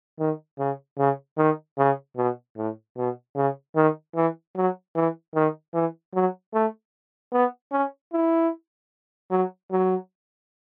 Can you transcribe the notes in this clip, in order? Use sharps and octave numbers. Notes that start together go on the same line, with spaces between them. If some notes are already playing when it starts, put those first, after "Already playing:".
D#3
C#3
C#3
D#3
C#3
B2
A2
B2
C#3
D#3
E3
F#3
E3
D#3
E3
F#3
A3
B3
C#4
E4
F#3
F#3